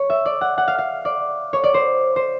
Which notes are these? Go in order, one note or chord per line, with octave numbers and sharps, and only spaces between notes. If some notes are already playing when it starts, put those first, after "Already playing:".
Already playing: C#5
E5
D5
F#5
F#5
F5
F5
D5
C#5
D5
C5
C5